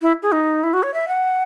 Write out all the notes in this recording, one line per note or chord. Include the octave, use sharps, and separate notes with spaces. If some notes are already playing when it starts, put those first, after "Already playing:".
E4
G#4
D#4
E4
F#4
C#5
E5
F#5